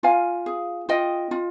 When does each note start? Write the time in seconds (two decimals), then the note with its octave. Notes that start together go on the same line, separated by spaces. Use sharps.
0.03 F4 F5 G#5
0.46 G#4
0.89 F4 D#5 G5
1.31 F4